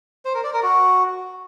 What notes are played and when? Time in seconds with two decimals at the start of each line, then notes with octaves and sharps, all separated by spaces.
0.25 C5
0.34 A#4
0.44 D5
0.53 A#4
0.63 F#4